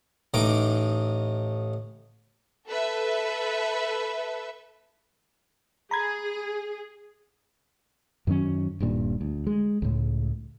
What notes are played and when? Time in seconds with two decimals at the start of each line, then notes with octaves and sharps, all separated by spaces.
0.34 A1 A2 D#4 D#5 D6
2.67 A4 B4 E5
5.91 G#4 A#5 B5 G#6
8.27 F#2 D#3 F#3 C#4
8.80 D#1 G2 A#2
9.21 D2
9.47 G#3
9.82 C#2 A2